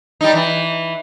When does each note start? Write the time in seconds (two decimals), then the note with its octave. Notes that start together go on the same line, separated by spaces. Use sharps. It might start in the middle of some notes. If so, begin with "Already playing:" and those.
0.21 G3 D#4
0.33 E3